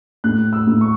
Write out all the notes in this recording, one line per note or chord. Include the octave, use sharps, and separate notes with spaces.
A2 F#6
E6
A2
C#6